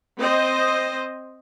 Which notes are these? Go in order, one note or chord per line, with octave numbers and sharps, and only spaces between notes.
C4 C5 D#5